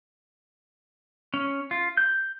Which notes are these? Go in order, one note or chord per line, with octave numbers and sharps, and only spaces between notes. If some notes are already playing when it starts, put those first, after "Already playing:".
C#4
F4
G6